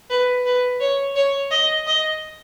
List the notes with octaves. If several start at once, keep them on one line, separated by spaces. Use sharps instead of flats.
B4
B4
C#5
C#5
D#5
D#5